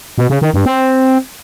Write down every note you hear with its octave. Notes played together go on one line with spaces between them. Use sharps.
B2
C#3
D#3
G2
C4